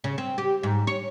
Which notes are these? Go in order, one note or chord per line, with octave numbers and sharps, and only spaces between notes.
C#3
C4
G4
G#2
C#5